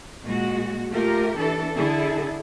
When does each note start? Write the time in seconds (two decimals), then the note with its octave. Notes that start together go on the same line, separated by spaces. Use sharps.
0.23 A#2 G#3 F#4
0.91 A3 F4 G4 A#4
1.38 E3 D4 A4
1.76 D3 E4 G#4 A4